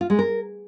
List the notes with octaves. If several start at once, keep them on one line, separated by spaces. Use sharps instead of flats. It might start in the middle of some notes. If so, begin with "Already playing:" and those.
F4
G#3
A#4